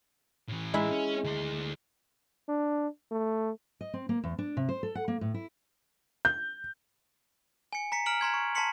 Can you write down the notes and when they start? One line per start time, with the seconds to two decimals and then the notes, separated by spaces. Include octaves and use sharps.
0.48 A2 E3
0.74 G#3 E4
0.91 C#4
1.24 D2 C5
2.48 D4
3.11 A3
3.81 D#5
3.94 C4
4.09 A#3
4.24 E2
4.38 D4
4.57 C3
4.69 C5
4.83 A4
4.95 F#5
5.08 A#3
5.21 A2
5.34 E4
6.25 G6
7.73 G#5 C#7
7.92 A#5 B6 C#7
8.06 A#5 F6 D7 F#7
8.21 A#5 C6 G#6
8.34 C#6
8.55 A5 A#5 C6 B6 C#7 F#7